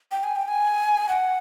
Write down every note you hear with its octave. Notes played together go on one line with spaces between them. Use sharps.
G5
G#5
G5
G#5
F#5